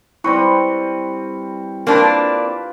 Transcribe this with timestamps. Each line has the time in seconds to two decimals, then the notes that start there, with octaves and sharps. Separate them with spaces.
0.24 G3 C4 E4 B4 C#6 C#7
1.87 A#3 C4 D4 F4 B4